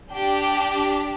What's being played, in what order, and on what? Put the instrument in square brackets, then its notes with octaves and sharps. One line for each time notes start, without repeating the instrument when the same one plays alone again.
[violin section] D4 G4 G5